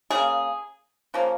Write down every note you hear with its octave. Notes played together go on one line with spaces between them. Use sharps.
C#3 A#3 G#4
C#3 F3 A#3